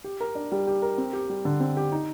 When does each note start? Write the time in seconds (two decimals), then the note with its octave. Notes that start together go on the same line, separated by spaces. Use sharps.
0.04 G4
0.21 A#4
0.35 D4
0.52 G3
0.67 G4
0.82 A#4
0.98 C4
1.13 G4
1.29 G3
1.45 D3
1.60 C4
1.77 G4
1.92 D#4